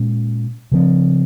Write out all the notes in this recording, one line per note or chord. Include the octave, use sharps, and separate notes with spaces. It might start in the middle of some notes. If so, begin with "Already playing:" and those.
Already playing: A#2 G#3 C#4
C#3 F3 C4